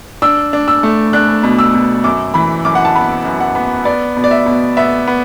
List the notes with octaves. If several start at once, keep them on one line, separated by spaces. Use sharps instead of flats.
D4 E6
D4
E6
A3
D4 F#6
B2
E6
B2
F#2 D6
E3 B5
F#2 D6
F#5
A5
B3 B5
F#2
F#5
B3
B3 D5
B2
D5
E5
B2
B3 E5
B3